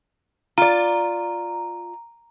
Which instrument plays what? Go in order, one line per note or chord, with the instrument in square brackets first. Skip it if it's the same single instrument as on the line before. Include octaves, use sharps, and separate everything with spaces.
[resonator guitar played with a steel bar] F4 D5 [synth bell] A#5